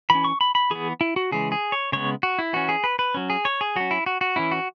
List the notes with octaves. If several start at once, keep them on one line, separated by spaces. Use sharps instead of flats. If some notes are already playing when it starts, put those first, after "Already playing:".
E3 C#4 B5
C#6
B5
B5
E3 B3 G#4
E4
F#4
C#3 E3 G#3 G#4
G#4
C#5
C#3 G#3 B3 C#5
F#4
E4
E3 C#4 F#4
G#4
B4
B4
F#3 C#4
G#4
C#5
G#4
F#3 C#4 F#4
E4
F#4
F#4
E3 C#4 E4
F#4